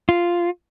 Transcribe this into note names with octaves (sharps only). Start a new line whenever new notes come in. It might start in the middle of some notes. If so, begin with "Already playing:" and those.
F4